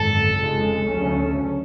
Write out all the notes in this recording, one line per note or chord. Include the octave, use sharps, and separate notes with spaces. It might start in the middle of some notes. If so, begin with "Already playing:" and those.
Already playing: G#1 F#2 D3 A4
F1 F2 C#3 G#3
D2 C#3 F#3 C#4